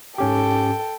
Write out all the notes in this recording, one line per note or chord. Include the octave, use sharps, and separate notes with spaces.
G#2 C#4 G4 A4 G5